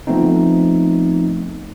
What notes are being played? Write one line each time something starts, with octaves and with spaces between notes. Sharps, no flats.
F3 A3 B3 C4 D#4